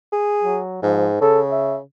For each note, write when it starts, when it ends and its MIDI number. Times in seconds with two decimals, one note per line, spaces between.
0.12 0.59 68
0.44 0.78 54
0.83 1.20 44
0.83 1.08 53
1.21 1.80 49
1.21 1.40 69
1.51 1.76 76